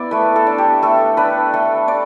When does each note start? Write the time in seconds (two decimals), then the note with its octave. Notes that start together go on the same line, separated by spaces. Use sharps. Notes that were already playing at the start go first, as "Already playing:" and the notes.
Already playing: B3 E4 D5 E5
0.11 A3 B4
0.36 A4
0.47 D4
0.58 G4
0.82 A3 A4
1.17 D4 B4
1.53 A3 A4
1.88 D4 D5